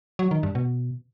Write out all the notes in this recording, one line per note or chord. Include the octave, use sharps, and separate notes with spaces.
F#3
D#3
G2
B2